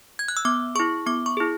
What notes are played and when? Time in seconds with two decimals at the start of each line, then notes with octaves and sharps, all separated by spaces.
0.19 G#6
0.28 F#6
0.37 E6
0.45 B3 D6
0.75 E4 G#4 C#6
1.06 B3 D6
1.26 C#6
1.37 E4 G#4